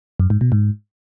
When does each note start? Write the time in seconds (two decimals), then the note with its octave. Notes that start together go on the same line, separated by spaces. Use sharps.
0.20 F#2
0.30 G#2
0.41 B2
0.52 G#2